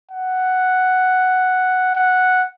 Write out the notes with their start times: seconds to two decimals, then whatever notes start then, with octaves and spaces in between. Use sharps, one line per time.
0.11 F#5
1.95 F#5